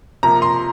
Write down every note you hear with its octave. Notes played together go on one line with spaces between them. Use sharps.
C3 F3 A#3 A#5
C6